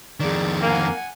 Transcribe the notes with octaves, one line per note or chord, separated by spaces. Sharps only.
F2 D#3 G#4 D5
A#3 F#5 G#5